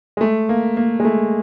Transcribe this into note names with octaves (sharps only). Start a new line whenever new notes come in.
G#3
A3
A#3
A#3
G#3
A3